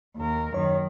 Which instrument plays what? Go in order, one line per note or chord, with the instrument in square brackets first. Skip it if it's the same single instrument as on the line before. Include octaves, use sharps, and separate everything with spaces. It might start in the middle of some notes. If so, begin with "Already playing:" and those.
[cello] D#2 A#4
[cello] F#2 D#3 [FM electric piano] C#5